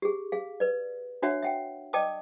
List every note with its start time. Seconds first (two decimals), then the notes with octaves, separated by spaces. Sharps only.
0.02 G4 G#4
0.32 G#4 F5
0.60 B4 D5
1.22 D4 F#4 C#5 E5 F#5
1.43 E5 F#5 G5
1.93 D5 D#5 G5 A5 D6 D#6